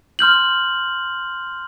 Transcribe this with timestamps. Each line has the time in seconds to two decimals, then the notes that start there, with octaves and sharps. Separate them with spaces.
0.19 C6 F6 G6 F#7